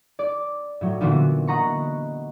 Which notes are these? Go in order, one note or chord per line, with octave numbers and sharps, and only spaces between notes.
D5
A2 F#3
A#2 D3 E3 B3 E4 F#4
D#5 F#5 A#5 B5 C#6